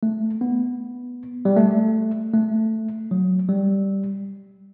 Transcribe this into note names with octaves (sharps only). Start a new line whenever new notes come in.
A3
B3
G3
A3
A3
F#3
G3